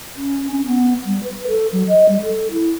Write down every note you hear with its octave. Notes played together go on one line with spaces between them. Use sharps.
C#4
C#4
B3
G3
B4
A4
F#3
D#5
G3
A4
E4